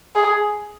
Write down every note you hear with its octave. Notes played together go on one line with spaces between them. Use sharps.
G#4